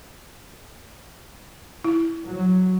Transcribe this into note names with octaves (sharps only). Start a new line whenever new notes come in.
E4
F#3